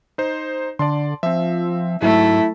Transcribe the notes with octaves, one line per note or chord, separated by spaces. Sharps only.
D#4 C5
D3 D5 A5 C6
F3 C4 E5
G#2 F#3 A3 E4